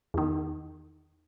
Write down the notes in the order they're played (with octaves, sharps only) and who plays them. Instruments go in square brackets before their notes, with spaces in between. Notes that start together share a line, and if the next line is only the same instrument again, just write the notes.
[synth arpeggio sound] E2 D#3